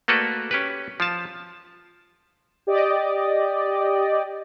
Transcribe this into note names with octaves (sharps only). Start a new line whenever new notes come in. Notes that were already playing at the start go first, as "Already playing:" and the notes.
A3 A#3 F#4 A4 B4 D5
C#4 G4 B4
F3 F4 A5
G4 D5 D#5